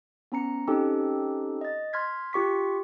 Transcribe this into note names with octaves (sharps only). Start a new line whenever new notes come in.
B3 C#4 A#5 C#7
C4 C#4 D#4 G4 A4
D#5 A6
C6 F6 G#6 B6
F4 G4 C#6 B6